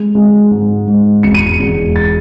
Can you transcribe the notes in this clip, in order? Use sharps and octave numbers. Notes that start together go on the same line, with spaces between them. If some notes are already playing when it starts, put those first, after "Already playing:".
Already playing: G#3
G#3
G#2
G#2
E1 C#7
D#7
C#7
E1
A6